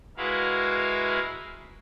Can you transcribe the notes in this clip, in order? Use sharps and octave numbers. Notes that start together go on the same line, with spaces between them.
G#3 E4 F#4 A#4 B4 F5